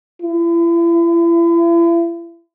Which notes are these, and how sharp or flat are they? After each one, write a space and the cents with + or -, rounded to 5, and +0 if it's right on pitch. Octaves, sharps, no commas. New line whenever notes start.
E4 +40